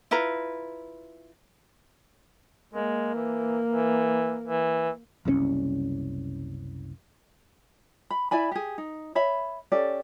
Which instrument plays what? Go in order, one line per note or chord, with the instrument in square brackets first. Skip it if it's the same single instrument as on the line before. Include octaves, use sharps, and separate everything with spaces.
[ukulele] E4 F4 B4 A#5
[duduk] G#3 [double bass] A#3
[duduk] E3
E3
E3
[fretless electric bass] F#1 C2 B2 C#4
[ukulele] B5
E4 D5 G#5 B5
G4 G#4
D#4
C#5 E5 B5
C#4 G4 A4 D5